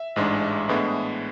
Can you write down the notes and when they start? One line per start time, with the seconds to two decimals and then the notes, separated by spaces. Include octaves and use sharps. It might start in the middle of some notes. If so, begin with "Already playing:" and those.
Already playing: E5
0.16 A1 G#2 G#3 D4
0.69 A2 E3 G#3 B3 D4